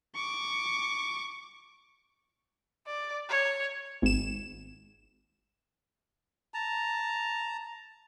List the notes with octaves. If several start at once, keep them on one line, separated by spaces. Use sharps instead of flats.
C#6 D6
D5
C#5
G#1 E7
A5 A#5